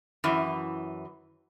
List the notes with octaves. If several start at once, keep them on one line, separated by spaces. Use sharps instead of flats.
F#2 E3